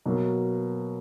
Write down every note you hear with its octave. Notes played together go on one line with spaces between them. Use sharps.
B2 F#3 A#3